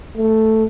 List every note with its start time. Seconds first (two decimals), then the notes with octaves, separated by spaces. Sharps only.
0.18 A3